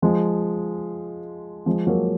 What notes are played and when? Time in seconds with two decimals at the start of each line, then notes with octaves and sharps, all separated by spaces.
0.02 F3 G#3
1.66 F3 G#3
1.87 F#3 A#3